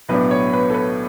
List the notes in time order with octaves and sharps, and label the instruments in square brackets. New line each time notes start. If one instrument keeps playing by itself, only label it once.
[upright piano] B1 A2 F#3 B3 D4 B4
C#5
B4
A4
B4